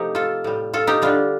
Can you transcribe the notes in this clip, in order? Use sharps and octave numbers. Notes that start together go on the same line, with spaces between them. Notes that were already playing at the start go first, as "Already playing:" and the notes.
Already playing: C3 F3 A3 D#4 G4
F4 A4
A2 G3
F4 A4
D#4 G4
D3 G3 D4 F4